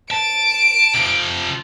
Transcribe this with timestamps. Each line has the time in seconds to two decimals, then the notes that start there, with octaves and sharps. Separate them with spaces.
0.11 A5 D7
0.94 C3 F3